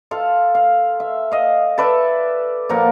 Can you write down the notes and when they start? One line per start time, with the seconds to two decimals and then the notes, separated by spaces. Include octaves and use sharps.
0.11 F4 A4 F5
0.55 F5
1.00 E5
1.32 D#5 F5
1.78 A4 B4 D5 E5
2.69 A#2 F3 A#4 F#5